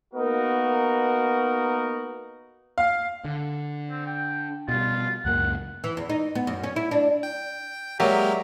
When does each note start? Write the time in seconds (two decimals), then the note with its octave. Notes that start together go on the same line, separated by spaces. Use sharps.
0.14 A#3 B3 D#4 F#4 A#4
2.78 F5
3.25 D3
3.90 C4
4.06 G5
4.69 B2 G3 F4
5.25 C#2 F#2 A#3 F#5
5.84 E3
5.97 E2
6.10 D#4
6.35 B3
6.47 F#2
6.63 C#4
6.76 E4
6.91 D4
7.23 G5
8.00 F#3 G#3 A#3 G4 A#4 D5 E5 A#5